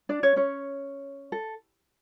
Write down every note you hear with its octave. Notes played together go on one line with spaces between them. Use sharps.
D4 D5
C#4 C#5
C#4 C#5
A4